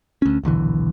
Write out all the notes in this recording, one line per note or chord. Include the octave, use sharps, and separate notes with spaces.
D2 C#4
D#1 B1 D3 E3